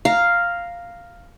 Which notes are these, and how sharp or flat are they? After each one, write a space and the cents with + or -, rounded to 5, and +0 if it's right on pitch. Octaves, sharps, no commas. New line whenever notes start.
F5 +0 A#5 +0